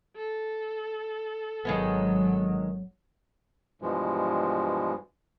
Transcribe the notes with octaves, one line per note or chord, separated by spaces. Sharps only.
A4
G#1 D#3 F#3 G#3 B3
G2 B2 E3 F3 G#3